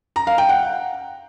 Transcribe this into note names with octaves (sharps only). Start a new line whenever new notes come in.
A#5
F5
G5
F#5